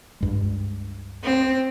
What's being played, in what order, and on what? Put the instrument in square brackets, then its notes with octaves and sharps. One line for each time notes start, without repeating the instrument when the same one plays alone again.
[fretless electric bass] C#2 G2 G#3
[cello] C4